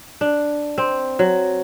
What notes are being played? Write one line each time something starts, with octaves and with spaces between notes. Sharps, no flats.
D4
C4
F#3